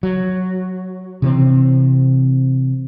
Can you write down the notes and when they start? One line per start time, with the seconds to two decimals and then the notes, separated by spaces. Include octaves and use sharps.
0.03 F#3
1.22 C3 E3 C4